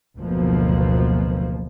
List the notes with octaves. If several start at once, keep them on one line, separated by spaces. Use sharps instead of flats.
F#1 D2 B2 F3 A#3